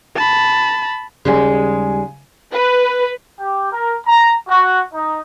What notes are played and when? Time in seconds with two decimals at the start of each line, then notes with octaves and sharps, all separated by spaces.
0.16 A5 B5
1.25 D#2 C#3 G3 G#3 G#5
2.52 B4
3.39 G4
3.72 A#4
4.06 A#5
4.48 F#4
4.94 D#4